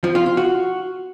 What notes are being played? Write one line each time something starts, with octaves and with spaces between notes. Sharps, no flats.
F3
F4
F4
F#4